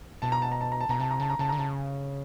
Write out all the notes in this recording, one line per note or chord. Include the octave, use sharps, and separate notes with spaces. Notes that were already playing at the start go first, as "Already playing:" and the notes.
B2 A5
A#5
A5
A#5
A5
A#5
A5
B2 A#5
C3 A5
A#5
C#3 A5
A#5
C#3 A5
D3 A#5
C#3 A5